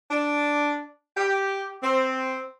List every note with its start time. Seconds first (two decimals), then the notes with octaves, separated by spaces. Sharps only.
0.11 D4
1.17 G4
1.83 C4